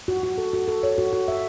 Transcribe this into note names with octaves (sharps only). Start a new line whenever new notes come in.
F#4
F#4
A4
F#4
A4
C#5
F#4
F#4
E5